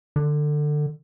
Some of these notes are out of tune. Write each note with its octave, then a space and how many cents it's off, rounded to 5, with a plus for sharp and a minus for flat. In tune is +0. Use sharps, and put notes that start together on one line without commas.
D3 +20